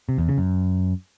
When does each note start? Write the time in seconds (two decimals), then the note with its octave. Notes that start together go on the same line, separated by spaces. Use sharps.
0.09 C3
0.18 E2
0.28 C#3
0.38 F#2